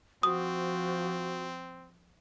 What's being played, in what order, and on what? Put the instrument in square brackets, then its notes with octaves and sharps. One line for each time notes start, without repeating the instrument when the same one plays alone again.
[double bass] F3 [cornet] C4 [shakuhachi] F#4 [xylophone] D#6